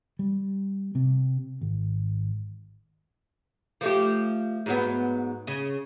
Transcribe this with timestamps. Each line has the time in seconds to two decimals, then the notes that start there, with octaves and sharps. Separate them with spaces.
0.19 G3
0.95 C3
1.61 G#1
3.81 F3 A3 G4
4.66 G#2 F#3 B3
5.47 C#3